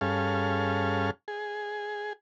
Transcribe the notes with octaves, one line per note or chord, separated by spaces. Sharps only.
G2 C#4 G#4 A4 F5
G#4